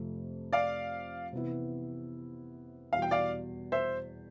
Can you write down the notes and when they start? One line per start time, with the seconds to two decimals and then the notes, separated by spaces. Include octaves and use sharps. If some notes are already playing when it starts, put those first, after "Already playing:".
Already playing: F2 C3 F3 A3
0.53 D5 F5
1.33 C3 E3 B3 E4
2.92 E2 B2 G3 F5
3.02 G5
3.11 D5 F5
3.72 C5 E5